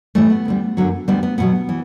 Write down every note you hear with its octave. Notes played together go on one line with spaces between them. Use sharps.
A2 E3 G3 A3
B3
D2 D3 G3
F#2 D3 F#3
D2 D3 G3 B3
B3
E2 B2 F#3 B3
E3